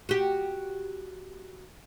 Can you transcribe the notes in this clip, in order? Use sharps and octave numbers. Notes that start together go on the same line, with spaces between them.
F#4 G4